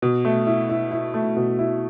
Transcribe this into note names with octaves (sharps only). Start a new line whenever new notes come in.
B2
A3
E4
E4
E4
A3
B2
E4